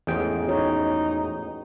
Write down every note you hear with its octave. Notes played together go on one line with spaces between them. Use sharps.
A1 E2 G#2 G#4 G5
D#4 F#4 C#5